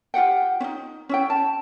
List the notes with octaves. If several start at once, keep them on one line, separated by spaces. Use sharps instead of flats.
F4 G4 F#5 G5
C#4 D#4
C#4 E4 G5
A5